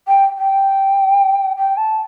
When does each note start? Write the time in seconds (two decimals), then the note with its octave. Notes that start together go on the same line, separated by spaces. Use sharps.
0.08 G5
0.38 G5
1.57 G5
1.77 A5